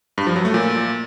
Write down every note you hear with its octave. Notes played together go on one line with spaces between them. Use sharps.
G2
F3
F#3
A3
A#2